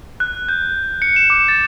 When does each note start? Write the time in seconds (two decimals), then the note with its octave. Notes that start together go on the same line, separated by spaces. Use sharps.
0.20 F#6
0.49 G6
1.02 C#7
1.16 E7
1.30 D6
1.48 A6